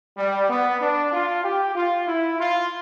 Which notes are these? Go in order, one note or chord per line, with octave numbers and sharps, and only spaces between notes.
G3
B3
D4
F4
G4
F4
E4
F4